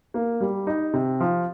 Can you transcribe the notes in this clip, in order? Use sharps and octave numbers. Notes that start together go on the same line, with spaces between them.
A#3
G3
D#4
C3
F3